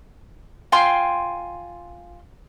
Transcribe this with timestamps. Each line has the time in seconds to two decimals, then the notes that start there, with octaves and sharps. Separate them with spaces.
0.72 F4 G5 G#5 C6